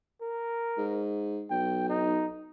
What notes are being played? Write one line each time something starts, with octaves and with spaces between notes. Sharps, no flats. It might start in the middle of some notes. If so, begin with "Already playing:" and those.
A#4
G#2
B1 G5
D#4